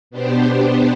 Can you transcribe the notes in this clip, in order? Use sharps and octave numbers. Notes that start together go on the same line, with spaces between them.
B2 B3 D4 G4 C5